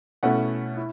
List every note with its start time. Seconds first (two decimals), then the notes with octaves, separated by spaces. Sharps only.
0.23 B2 A3 C#4 E4 F#5
0.77 E4